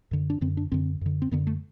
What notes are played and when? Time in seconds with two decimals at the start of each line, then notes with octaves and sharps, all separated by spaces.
0.11 F#2 D3
0.30 D4
0.41 F#2 D3 C4
0.57 D4
0.72 F#2 D3 C4
1.01 F#2 D3
1.22 C4
1.31 F#2 D3 B3
1.47 A3